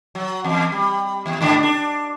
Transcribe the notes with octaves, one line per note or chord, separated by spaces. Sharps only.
F#3
E2
G3
D#2
G#2 D3 D4
D4